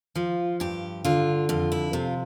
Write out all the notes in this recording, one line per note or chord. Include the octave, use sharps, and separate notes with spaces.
F3 F4
G2 G4
D3 F4
F2 F4
E4
C3 F4